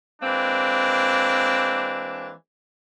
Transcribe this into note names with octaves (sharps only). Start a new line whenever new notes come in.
E3 G#3 A#3 C4 D4